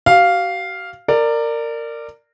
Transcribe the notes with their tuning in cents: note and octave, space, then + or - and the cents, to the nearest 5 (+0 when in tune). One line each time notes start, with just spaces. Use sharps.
F#4 +45 F5 +0
A#4 -20 D5 +10